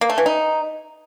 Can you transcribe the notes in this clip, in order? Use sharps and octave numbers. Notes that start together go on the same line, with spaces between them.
A#3
A3
E3
D#4